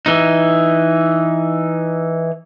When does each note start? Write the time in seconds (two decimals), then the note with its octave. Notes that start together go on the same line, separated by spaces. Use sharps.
0.06 E3 D#4